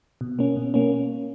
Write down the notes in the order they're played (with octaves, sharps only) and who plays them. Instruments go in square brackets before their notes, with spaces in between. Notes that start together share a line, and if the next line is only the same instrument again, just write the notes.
[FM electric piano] B2
A#3 C#4
B2
A#3 C#4